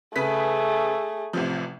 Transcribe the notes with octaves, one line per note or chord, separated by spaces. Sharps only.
C#3 A3 G#4 B4 B6
A1 C3 F3